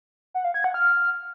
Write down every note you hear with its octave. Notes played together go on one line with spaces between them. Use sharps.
F#5
F5
G#6
F#5
F6